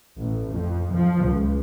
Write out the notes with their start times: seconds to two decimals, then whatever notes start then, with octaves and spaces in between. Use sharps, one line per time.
0.19 A1
0.49 F2
0.94 F3
1.25 C#2